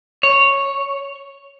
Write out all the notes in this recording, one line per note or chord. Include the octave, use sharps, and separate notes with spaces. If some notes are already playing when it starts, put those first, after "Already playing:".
C#5